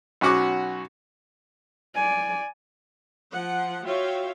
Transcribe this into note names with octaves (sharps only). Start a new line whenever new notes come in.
B1 C#4 F#4 F#5 D6
D5 G#5
F3 F#5
F4 F#4 C#5 E5 F5 G5